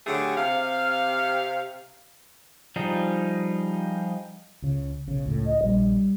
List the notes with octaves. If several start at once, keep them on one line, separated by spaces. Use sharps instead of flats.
D3 F#3 A3 G4 G#4
C3 F5
F3 G3 D#4 G#4
C#2 C#3
B1 C#3
C#2 A2
D#5
A#1 G3